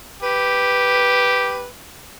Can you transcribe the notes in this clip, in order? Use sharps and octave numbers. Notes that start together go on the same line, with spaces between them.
G4 B4